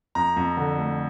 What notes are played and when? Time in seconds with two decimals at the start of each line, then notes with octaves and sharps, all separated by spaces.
0.15 F2 A#5
0.37 F2
0.57 D3
0.78 A3